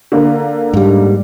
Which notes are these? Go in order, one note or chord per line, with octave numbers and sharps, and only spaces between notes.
D3 A#3
G#2 G3